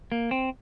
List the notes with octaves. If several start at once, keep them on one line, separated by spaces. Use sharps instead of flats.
A#3
C4